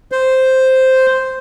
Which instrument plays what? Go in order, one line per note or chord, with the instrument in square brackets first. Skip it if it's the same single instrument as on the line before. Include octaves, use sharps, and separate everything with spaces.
[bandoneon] C5